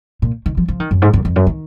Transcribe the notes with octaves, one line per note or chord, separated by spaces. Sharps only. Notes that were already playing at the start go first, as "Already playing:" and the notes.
A#2
D#3
F3
F3
D#3
F#2
G#2
F#2
F2
F#2
D#3